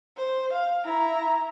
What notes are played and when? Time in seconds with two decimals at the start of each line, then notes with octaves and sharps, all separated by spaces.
0.17 C5
0.53 F5
0.85 E4 A#5